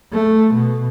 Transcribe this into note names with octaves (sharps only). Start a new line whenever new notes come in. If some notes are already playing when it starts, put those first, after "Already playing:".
A3
B2